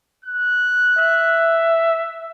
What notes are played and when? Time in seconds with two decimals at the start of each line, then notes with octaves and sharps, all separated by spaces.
0.25 F#6
0.98 E5